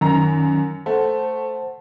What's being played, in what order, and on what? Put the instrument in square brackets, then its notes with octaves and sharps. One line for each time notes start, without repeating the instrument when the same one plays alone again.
[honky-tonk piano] F#2 A#5 [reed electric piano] D#3
[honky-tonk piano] A3 [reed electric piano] C5 F#5 A5